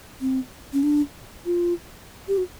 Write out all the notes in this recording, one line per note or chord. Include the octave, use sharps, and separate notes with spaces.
C4
C#4
D4
F4
G4
F#4